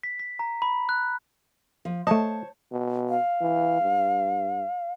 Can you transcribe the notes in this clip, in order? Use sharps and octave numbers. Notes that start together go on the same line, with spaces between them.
B6
B6
A#5
B5
F#6
F3
A3 C5 C#5 D#5 A5
B2
F5
E3
G2